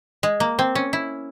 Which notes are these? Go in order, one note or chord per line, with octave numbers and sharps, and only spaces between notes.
G#3
A#3
C4
C#4
E4